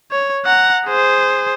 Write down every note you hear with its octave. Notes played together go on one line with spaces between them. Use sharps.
C#5
F#5 A#5
G#4 C5